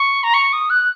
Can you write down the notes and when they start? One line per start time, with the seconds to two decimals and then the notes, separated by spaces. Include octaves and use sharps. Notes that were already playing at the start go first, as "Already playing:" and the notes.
Already playing: C#6
0.23 A#5
0.34 C#6
0.53 D#6
0.70 F#6